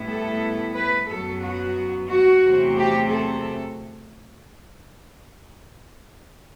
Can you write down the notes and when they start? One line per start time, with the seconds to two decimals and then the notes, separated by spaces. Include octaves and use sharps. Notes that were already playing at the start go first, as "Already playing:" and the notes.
Already playing: A2 G3 B3 E4
0.09 A4
0.76 B4
1.09 F#2 F#3 B3 A4
1.42 F#4
2.09 F#4
2.42 E2 C3 F#3 A3 C4
2.76 G4
3.10 A4